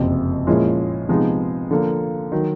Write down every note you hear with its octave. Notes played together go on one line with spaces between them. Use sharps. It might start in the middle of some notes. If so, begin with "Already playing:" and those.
Already playing: F#1 F2 C3
A#2 F3 G#3 C#4 E4
C3 F3 G#3 B3 D#4
D3 F3 A#3
D#3 F#3